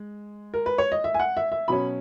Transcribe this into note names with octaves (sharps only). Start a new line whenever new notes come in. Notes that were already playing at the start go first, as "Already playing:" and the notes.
Already playing: G#3
A#4
B4
C#5
D#5
E5
G#5
F#5
E5
E5
B2 F#3 C#4 B5